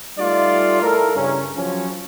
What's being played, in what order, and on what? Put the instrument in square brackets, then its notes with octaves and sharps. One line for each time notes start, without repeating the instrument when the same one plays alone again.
[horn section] G3 A3 D#4 F4 D5
E4 A4 A#4
G2 C#3 C#4
F3 F#3 C#4